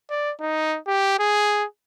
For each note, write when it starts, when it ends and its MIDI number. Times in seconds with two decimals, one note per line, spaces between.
0.10 0.32 74
0.40 0.77 63
0.87 1.14 67
1.19 1.65 68